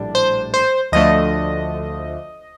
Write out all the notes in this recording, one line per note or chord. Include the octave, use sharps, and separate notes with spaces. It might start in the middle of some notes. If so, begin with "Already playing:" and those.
Already playing: A#1 A2 G3 D4
C5
C5
D2 D3 F3 A3 D4 D#5